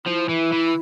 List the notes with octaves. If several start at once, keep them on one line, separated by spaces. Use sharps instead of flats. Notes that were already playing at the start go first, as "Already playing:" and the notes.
F3 E4
E3
E3